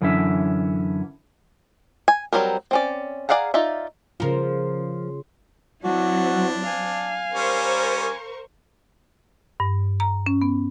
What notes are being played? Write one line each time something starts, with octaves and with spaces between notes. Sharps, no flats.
F#2 D3 E3 C#4 E5
G#5
F#3 G3 C4 A#4
C4 C#4 D5
G#4 D5 F5 F#5 A#5
D#4 F4 D5 E5
C#3 F3 F4 A#4
F#3 C4 D4 E4 F#4
F5 G#5
G3 C#4 A#4 C5 C#6
G2
A#5
C#4
B3